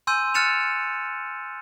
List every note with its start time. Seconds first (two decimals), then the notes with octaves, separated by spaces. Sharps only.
0.07 G#5 C6 E6 G6 D#7
0.34 F6 F#6 A6 C#7 E7 F7